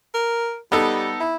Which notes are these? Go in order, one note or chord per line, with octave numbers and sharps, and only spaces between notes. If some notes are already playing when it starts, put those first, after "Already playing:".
A#4
G3 B3 D#4 A4
E4